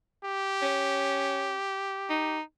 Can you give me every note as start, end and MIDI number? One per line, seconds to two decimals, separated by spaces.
0.24 2.38 67
0.62 1.59 61
2.10 2.41 63